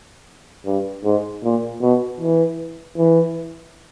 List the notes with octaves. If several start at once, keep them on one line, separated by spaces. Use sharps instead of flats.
G2
G#2
A#2
B2
E3
E3